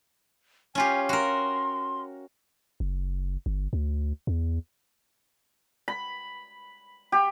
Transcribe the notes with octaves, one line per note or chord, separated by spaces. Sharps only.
C#4 F4 G4 G#5
F#4 A#4 C6
F#1
G1
D2
E2
B5
G4